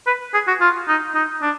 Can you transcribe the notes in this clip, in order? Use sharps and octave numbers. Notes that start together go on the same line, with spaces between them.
B4
G#4
F#4
F4
D#4
D#4
D4